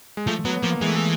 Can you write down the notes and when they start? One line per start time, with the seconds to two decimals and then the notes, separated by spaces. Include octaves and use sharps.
0.17 G#3
0.27 F3 A3
0.45 F#3 B3
0.63 F3 A#3
0.81 E3 G#3
0.88 A3
0.97 G#3